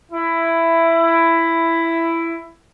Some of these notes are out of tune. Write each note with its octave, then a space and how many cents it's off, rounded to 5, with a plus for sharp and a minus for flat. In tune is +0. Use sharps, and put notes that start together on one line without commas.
E4 +10